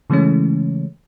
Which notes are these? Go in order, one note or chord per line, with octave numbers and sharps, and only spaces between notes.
C#3 E3 G#3 A3 C#4